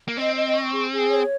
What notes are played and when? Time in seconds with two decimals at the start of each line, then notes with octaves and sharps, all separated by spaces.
0.08 A#3
0.17 C4 D#5
0.36 D#5
0.55 C#6
0.73 G#4
0.92 G#4
1.10 C#5